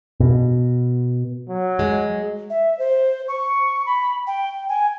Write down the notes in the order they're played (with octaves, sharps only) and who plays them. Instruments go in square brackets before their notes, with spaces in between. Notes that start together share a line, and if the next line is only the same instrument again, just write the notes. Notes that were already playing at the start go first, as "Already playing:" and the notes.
[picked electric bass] B2
[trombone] F#3
[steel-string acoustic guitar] G#3
[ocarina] E5
C5
C#6
B5
G5
G#5